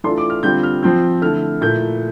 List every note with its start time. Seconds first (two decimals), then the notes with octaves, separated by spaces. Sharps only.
0.04 E3 A3 D4 F4 C6
0.18 D6
0.30 F6
0.43 D3 G3 C4 F4 G6
0.63 F6
0.83 F3 C4 F4 G6
1.22 D3 A3 E4 F6
1.61 A#2 A3 E4 G6